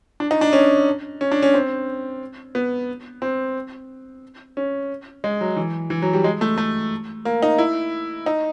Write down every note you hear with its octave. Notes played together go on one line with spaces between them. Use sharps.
D4
D#4
D4
C#4
C#4
D4
C#4
C4
B3
C4
C#4
G#3
F#3
E3
E3
F#3
G3
G#3
A3
A3
A#3
D#4
E4
D#4